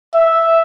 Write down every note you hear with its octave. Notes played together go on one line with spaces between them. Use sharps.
E5